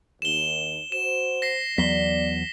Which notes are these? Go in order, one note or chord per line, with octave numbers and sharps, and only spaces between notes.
D#2 E7 G7
F#4 C5 E7
A#6 C7
E2 F#3 B3 D5 B6 G7